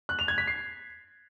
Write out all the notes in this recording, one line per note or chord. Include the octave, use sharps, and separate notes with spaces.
F#6
F7
G#6
B6
C7